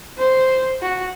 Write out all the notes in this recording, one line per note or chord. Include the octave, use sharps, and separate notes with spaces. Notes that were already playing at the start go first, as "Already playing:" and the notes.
C5
F#4